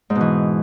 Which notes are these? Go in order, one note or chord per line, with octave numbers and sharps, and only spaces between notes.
G#2
B2
E3